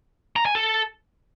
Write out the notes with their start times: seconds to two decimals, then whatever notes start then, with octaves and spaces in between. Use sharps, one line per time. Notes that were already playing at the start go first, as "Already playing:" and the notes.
0.36 A#5
0.46 G#5
0.55 A4